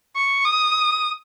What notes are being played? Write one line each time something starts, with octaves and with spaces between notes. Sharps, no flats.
C#6
D#6